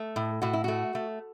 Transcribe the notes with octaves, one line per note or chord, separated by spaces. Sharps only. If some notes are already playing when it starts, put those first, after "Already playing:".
Already playing: A3
A2
A2 F#4
E4
A3 F#4
A3